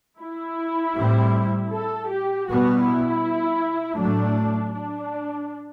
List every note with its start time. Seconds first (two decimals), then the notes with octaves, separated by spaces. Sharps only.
0.21 E4
0.96 A2 G3 C4
1.71 A4
2.09 G4
2.48 B2 G3 B3 F#4
2.84 E4
3.98 A2 F#3 A3 D4
4.74 D4